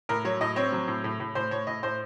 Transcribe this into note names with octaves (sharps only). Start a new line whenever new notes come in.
A2 A#4
F#3 C#5
A2 D#5
C4 C#5
F#3
A2
A2
A2
A2 C5
A2 C#5
A2 D#5
A2 C5